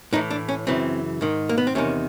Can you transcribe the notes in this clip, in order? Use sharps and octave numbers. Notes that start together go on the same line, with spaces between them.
A2 E3 D#4
D4
C#4
F#2 C#3 E3 C4
G#2 D#3
A#3
B3
C4
E2 C3 D#3 C#4